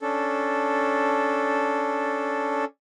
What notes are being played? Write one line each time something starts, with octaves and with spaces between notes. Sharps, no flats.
C#4 D4 A4